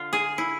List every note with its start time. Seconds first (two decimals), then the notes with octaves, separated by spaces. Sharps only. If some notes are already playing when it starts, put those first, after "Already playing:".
Already playing: D3 D4 F4
0.13 G#4
0.38 E4